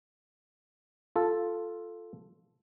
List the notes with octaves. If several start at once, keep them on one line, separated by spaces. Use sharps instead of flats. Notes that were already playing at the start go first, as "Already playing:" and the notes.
F4 A4